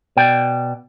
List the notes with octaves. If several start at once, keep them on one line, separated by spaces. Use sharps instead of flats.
B2 D5 G5